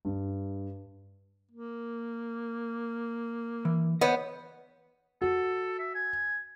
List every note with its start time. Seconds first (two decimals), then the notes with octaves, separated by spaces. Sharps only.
0.05 G2
1.51 A#3
3.65 E3
4.01 B3 C5 C#5 D#5
5.22 F#4 A4
5.79 E5
5.94 G#5